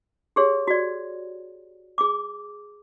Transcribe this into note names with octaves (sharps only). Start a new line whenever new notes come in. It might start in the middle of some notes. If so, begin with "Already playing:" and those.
G4 G#4 C#5
F#4 D5
G#4 D6